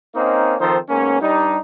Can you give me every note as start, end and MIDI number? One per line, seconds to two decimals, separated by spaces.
0.15 0.54 58
0.15 0.54 60
0.15 0.54 61
0.15 0.54 63
0.60 0.78 51
0.60 0.78 53
0.60 0.78 60
0.60 0.78 63
0.60 0.78 69
0.60 0.78 72
0.89 1.21 44
0.89 1.21 58
0.89 1.21 59
0.89 1.21 61
1.22 1.58 43
1.22 1.58 55
1.22 1.58 62
1.22 1.58 63